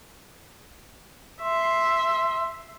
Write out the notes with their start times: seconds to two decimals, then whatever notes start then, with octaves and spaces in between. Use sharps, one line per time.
1.42 E5 C6